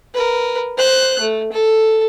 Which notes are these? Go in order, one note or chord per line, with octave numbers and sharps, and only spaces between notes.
A#4 B4
C5 F#6
A3
A4